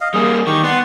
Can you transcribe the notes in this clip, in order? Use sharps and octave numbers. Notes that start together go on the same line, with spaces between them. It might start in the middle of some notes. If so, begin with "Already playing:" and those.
D#5 F5
G3 A#3 G#4
D#3 G4 C#6
B3 D5 F#5 C6